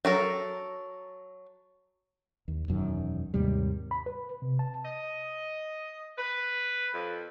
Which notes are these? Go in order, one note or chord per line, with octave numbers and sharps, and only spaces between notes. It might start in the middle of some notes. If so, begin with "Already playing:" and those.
F#3 A4 A#4
D#2
E1 F#2 D#3
D#2 G#2 C3 G3
B5
B4
C3
A5
D#5
B4
F2